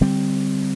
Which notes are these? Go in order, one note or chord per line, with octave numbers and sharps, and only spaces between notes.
D3 G3 C4